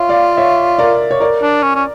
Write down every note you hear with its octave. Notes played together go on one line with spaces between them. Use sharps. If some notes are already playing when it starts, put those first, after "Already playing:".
Already playing: F4 C#5 E5
D5 F5
C#5 E5
A#4 D5
C#5
A#4 D5
D4
C#4
C#4